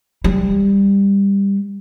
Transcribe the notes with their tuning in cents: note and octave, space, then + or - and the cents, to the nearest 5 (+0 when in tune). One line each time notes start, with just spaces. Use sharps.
G3 +15